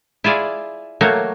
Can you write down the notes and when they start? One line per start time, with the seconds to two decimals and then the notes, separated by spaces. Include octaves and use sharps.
0.24 E4 F4 G#4 D5
1.01 F#3 A3 A#3 C#5